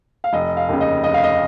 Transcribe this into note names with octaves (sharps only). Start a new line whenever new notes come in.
F5
F1 D#5
F5
D#2 C#3
D#5
F1 D#5
F5
D#5